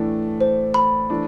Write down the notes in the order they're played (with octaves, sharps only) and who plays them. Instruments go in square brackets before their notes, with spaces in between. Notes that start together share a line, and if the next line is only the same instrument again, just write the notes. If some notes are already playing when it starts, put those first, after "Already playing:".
Already playing: [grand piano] A2 E3 A3 D4
[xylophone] C5
B5
[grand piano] E3 A3 D4